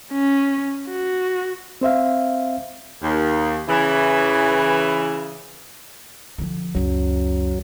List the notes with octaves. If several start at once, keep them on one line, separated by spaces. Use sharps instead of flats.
C#4
F#4
C4 C5 E5 F5
D#2
C#3 E3
D3 F3
C#2 F#2 F#3 C#4